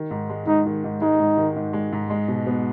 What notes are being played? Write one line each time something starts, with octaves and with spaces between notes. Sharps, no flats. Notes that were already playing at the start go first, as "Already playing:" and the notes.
Already playing: D#3
G#2
G#3
G#2 D#4
D#3
G#2
G#3 D#4
G#2
D#3
G#2
G#3
G#2
G#3
B2
B3